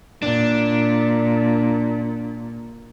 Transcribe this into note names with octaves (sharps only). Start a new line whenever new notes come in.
A#2 D4